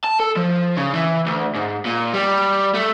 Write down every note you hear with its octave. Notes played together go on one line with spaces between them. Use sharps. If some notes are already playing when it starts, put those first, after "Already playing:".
A5
A4
F3
C#3
E3
D2
G#2
A#2
G3
A3